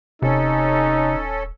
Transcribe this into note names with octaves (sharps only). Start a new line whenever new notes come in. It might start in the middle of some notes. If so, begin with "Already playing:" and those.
D#1 C3 C#4 D#4 A4